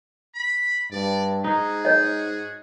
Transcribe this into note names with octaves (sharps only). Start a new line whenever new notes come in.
B5
G2 D5
G#2 D#4 F#4 G#4
C#5 D#5